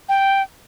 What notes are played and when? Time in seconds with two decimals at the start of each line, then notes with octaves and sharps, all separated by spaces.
0.09 G5